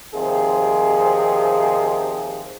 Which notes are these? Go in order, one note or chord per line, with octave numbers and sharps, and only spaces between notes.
D#2 C3 F3 C4 G#4